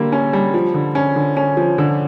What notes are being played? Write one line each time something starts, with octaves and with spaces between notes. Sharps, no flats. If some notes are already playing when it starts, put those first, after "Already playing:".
Already playing: D3 G3 A#3
C#4
G3
F3
D3
C#4
D3
C#4
F3
D3